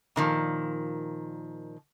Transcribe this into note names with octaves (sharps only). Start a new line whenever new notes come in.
A#2 D#3 F3